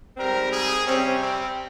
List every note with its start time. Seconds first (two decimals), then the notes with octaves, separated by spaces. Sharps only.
0.17 G#2 G3 C4 A#4
0.51 G#4
0.85 C3 G3 C4 C#4
1.20 C4